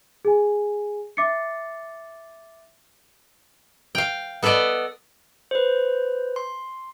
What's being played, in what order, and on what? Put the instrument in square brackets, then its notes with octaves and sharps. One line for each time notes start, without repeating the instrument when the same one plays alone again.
[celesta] G#4 G#5
E5 D6 A6 C7 C#7
[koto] F5 G5
B3 A4 B4 D5 D#5
[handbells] B4 C5
C6